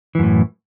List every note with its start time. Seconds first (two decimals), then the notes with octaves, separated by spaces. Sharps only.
0.15 E3
0.19 F#2
0.23 A2